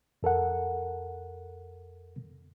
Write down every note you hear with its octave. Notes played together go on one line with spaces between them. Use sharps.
F2 A4 A#4 F#5